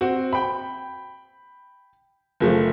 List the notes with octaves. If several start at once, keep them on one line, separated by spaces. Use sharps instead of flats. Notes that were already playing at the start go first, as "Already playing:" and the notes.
C4 F#4
G5 B5
F#1 F3 A3